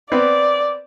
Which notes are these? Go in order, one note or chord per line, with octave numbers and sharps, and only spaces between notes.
B3 C4 B4 D5